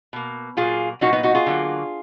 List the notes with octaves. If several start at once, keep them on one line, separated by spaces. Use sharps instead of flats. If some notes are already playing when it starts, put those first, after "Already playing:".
B2 A#3
A#2 F#3 A#3 F4 G#4
A#2 F#3 A#3 D#4 F#4
B3 D#4
D#4 F#4
F4 G#4
D3 F#3 A#3